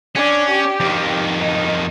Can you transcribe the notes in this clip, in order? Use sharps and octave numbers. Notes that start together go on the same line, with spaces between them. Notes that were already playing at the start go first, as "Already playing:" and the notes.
C#4 D4
G4
F2 D#3
D#4